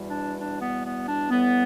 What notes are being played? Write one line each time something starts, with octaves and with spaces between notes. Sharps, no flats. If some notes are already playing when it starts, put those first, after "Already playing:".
Already playing: E2 B2 G3
D4
D4
B3
B3
D4
A2 E3 G3 B3